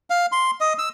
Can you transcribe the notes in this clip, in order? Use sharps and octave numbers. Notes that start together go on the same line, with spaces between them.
F5
C6
D#5
E6